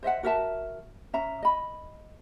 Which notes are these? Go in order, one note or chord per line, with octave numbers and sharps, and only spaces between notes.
C5 D#5 E5 F#5
F#4 A#4 E5 A5
C#4 E5 A#5
D#5 B5